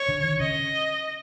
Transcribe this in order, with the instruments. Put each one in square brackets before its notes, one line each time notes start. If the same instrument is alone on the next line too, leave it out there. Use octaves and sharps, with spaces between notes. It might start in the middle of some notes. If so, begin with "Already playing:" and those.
Already playing: [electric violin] C#5
[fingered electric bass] D3
D#3
[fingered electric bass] C#3 [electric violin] D#5